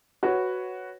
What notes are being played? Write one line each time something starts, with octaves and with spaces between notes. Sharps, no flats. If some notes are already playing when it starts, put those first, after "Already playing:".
F#4 B4 C#5